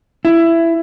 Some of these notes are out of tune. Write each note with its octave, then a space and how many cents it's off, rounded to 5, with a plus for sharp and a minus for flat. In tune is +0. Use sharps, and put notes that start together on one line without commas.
E4 +15